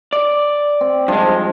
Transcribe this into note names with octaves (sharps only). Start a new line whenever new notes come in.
D5
C4
G2 F3 G#3